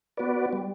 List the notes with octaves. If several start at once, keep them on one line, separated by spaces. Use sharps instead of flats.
B3 F#4 B4 D5
G3